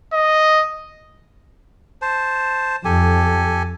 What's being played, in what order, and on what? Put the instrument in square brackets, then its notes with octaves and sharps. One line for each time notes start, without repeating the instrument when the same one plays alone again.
[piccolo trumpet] D#5
[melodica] C5 A5
[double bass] F2 [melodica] G4 A4 G#5